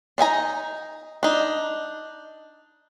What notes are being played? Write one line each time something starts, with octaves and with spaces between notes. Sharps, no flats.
D4 D#4 G#5 A#5
D4 D#4